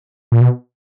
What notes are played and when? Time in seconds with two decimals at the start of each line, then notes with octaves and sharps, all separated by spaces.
0.32 A#2
0.41 B2